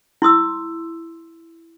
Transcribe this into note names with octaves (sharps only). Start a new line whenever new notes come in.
E4 C6 D#6 E6